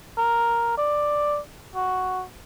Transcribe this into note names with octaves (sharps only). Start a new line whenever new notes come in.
A#4
D5
F#4